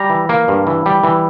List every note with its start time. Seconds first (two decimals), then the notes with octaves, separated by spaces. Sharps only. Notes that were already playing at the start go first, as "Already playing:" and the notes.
Already playing: G3 A#5
0.10 E3
0.29 A#3
0.48 G2
0.67 E3
0.86 G3
1.03 E3